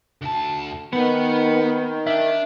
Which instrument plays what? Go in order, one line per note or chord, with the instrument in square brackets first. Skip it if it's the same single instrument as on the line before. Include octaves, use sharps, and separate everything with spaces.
[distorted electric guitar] D2 A5
[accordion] D#3 [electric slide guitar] B3 [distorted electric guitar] B4 F#5
[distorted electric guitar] D4 [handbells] E5